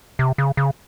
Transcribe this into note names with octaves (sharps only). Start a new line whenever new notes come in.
C3
C#3
C#3